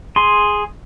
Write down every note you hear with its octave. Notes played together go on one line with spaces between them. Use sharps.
G#4 C6